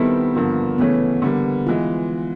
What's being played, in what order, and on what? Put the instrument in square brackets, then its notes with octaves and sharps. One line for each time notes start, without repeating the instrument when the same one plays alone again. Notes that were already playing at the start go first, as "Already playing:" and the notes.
Already playing: [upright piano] D#3 G3 C4 E4 A4 [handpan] B3
[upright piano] G2 D3 F3 A#3
[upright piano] C#3 E3 A3 C#4 [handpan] B3
[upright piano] D3 G3 A#3
[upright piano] E3 G#3 [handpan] F4